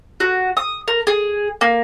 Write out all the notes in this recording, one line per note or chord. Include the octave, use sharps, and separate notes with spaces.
F#4
D#6
A#4
G#4
A#3